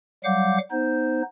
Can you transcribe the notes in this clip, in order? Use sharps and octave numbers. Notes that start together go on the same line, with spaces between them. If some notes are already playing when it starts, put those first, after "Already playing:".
F#3 G3 F5 F#5 D6 G6
B3 D#4 C5 G6